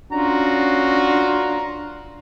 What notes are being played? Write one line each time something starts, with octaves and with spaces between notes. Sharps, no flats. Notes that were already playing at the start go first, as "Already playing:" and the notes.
C#4 D4 F4 F#4 A#5